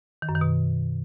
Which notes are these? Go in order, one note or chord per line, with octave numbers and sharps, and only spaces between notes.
D#3
F#2
D#3
B2